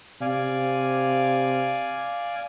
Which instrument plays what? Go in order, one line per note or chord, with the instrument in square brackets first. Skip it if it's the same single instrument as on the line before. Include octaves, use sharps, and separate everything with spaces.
[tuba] C3 [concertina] D5 F5 G#5